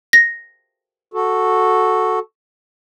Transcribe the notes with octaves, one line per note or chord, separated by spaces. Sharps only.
A#6
F#4 A4